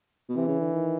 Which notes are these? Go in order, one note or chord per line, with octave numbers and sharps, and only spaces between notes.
B2
C3 E3
C#3
D3
D#3